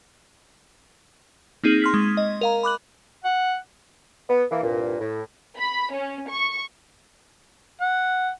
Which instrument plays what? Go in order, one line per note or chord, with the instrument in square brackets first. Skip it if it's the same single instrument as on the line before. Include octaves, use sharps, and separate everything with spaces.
[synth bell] A#3 C4 D#4 G#4 D#7 F#7
C6 F6 B6
G#3
D#5
A#4 F5 A#5
B5 D6 F#6 F#7
[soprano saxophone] F#5
[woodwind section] B3
E3 A#3
C2 G2 A#2
A2
[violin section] B5
C#4
C#6
[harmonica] F#5